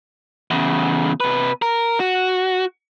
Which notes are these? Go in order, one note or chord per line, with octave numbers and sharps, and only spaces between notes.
E2 C#3
C3 B4
A#4
F#4